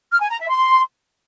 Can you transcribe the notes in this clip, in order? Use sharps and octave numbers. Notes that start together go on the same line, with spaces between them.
F6
G#5
A#5
E5
C6